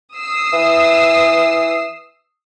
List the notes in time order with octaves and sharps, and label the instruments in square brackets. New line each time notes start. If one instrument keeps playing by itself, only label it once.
[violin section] D#6 E6 C7
[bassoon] E3